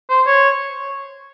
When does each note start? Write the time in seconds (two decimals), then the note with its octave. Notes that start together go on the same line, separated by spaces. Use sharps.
0.10 C5
0.26 C#5